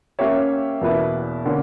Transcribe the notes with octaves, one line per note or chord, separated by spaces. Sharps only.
A#3 C#4 G4 C#5 E5
E2 B2 A#3 E4 B4
D3 A#3 C#4